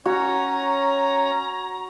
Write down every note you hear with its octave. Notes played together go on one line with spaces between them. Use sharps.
C#4 F#4 C#5 A#5